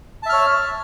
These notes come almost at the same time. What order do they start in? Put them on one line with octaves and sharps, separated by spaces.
A5 E5 F6 C#5